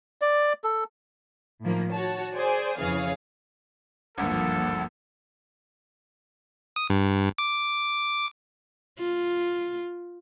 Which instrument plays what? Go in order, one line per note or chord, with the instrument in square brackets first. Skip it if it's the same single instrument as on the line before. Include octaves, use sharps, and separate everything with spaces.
[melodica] D5
A4
[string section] A2 D#3 F3 A#3
F#4 C#5 A5
G#4 C5 D5 G#5
F2 C#3 E3 G#4 C#5 F5
[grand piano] G#1 D2 G2 [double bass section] F3 A#3 [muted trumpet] A4 [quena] F#5
[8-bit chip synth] D#6
G2
D6
[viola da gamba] F4